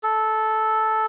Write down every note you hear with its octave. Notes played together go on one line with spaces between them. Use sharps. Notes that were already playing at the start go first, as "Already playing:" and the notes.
A4